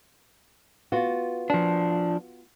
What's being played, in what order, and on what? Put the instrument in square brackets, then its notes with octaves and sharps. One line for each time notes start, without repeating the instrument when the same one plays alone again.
[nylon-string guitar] B3 F4 F#4
[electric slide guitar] F3 D4